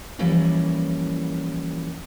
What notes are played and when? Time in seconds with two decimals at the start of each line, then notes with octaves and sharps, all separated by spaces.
0.19 E3 F3 G3 A#3 C#4 E4